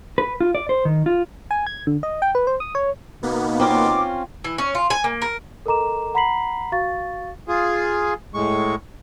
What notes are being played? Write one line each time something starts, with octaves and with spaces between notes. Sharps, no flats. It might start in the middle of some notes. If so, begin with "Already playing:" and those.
B4
F4
D5
C5
D#3
F4
G#5
G#6
D3
D#5
G5
B4
C5
D#6
C#5
B2 A#3 B3 D#4
C4 C#4 F4 D6
E3
C#4
F4
G#5
A#3
A#4
A4 A#4 D#5 A#5 D6 E7
F#5 A#5 B5 B6 C7 F#7
F#4 F5 C#6 A6
F4 G#4
A2 G#3 C#6